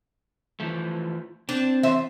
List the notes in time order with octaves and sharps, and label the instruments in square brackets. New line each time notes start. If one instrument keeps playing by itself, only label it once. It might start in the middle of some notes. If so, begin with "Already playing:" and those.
[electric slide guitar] E3 F3 A3
[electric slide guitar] C4 [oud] D4
[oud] E2 C5 E5